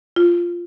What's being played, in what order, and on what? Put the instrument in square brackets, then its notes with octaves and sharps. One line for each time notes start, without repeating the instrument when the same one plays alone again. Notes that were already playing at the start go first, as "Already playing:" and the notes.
[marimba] F4